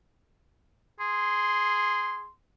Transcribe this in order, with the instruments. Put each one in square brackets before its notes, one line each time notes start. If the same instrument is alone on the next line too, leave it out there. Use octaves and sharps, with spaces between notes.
[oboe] G#4 [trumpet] C6